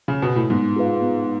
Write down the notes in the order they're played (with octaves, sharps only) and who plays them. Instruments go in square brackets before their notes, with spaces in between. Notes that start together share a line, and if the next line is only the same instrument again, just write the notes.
[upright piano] C#3
B2
A2
[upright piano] G#2 [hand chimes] B3
[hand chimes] F4 G#4 B4 F5
B3